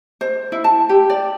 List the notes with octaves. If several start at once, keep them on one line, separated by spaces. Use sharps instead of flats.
C5
E4
A5
G4
D5